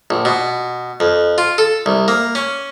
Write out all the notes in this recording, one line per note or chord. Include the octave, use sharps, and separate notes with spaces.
A#1
B2
F2
F4
A4
C2
A#3
C#4